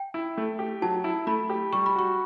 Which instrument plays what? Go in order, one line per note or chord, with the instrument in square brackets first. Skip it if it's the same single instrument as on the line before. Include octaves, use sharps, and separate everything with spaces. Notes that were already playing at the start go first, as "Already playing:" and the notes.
Already playing: [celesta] G5
[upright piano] E4
A3
G4
[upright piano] F#3 [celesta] A5
[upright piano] E4
[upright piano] A3 [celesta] B5
[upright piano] G4
[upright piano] G3 [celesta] C#6
[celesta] B5
[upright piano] F#4 [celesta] C#6